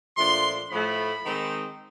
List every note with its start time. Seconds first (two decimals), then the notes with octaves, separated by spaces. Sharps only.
0.17 A#2 F3 A3 D4 C6
0.70 A2 F3 A3 B5
1.23 D#3 G#3 C4 D#4